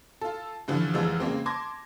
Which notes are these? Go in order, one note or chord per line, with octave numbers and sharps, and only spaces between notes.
F4 A4
G2 D3 E3 F3
F1 E3 F3 G#3 F5 E6
C#3 G#3 A#3 C4
A5 C6 D6 G#6 A#6